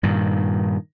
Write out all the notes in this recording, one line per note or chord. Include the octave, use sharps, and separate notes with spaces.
G2 A#2 D#3